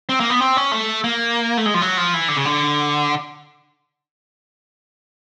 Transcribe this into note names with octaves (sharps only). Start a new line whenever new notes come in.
C4
A#3
B3
C4
C#4
A3
A#3
A3
G#3
F3
F#3
F3
E3
D3
C#3
D3